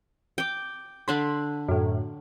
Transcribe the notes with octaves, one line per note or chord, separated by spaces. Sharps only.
G5 D6
D3 D4 B5 C6
F#2 A2